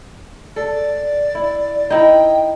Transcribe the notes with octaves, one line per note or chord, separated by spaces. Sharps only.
A4 D5
E4
D#4 E4 D#5 G5